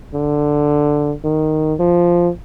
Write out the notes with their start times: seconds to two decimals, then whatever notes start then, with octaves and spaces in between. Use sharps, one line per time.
0.14 D3
1.24 D#3
1.79 F3